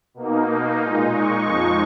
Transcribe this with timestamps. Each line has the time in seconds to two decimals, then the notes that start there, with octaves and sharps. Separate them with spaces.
0.14 B2 A#3 D#4
0.79 A#2 G#3 D#4
1.10 C#6
1.43 F2 F3 G#3 D#4 C#6